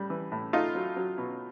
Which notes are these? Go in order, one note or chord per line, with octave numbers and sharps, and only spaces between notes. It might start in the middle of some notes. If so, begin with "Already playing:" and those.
Already playing: A2 G3
E3
A2
A3 D#4 F4
F#3
F#3
B2